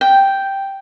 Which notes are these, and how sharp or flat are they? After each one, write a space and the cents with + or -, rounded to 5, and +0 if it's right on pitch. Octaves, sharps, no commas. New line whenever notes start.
G5 +0